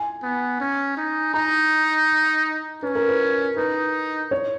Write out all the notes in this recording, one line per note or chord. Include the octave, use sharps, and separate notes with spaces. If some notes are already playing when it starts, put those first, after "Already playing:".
Already playing: G#5
B3
C#4
D#4
D#4 A#5
C#4 B4
A#4
B4
D#4 B4
C#5